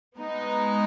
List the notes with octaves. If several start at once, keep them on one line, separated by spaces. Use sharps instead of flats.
G#3 B3 D#4